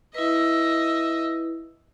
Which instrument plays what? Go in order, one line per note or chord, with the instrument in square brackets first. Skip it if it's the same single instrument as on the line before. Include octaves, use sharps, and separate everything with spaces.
[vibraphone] E4 B4 [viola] D#5 E5